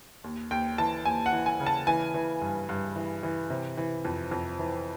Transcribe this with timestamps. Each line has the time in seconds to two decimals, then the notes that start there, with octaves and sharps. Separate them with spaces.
0.24 D#2
0.51 D#2 G5
0.78 E3 A5
1.05 D#2 G#5
1.26 F#5
1.32 E3
1.46 G#5
1.60 C#3
1.67 A5
1.87 E3 G#5
2.14 E3
2.41 G2
2.69 G2
2.96 E3
3.23 E3
3.50 C3
3.77 E3
4.05 F2
4.31 F2
4.59 E3